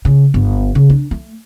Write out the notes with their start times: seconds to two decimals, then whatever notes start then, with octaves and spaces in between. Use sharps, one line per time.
0.05 C#3
0.34 G1
0.75 C#3
0.90 D4
1.11 A3